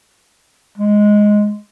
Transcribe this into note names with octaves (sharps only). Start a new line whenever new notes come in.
G#3